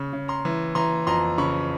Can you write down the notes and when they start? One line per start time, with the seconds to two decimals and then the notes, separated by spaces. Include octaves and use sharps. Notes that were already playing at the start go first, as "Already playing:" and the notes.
Already playing: C#3 C#6
0.13 C#3
0.28 A#5 C6
0.45 E3
0.75 E3 A#5 C6
1.07 F2 A#5 C6
1.38 C#3 B5 C#6